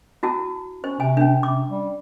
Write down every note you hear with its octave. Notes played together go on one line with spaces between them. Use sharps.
E4 F#4 A5
C#4 C5
C3 G#5
C#4 D4
C3 D6
G3